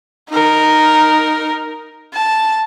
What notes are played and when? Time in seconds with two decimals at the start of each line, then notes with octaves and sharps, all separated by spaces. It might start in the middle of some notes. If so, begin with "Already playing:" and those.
0.30 D#4 A#4
2.14 A5